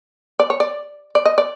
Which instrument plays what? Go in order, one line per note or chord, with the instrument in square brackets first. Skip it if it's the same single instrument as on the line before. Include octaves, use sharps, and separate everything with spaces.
[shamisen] D5
C#5
D5
D5
D#5
D5